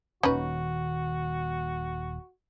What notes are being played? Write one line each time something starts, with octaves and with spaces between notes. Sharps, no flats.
D#1 D#2 D#3 C#4 D#4 F#4 B4